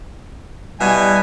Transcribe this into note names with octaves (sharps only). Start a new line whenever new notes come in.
B2 G3 E4 G#5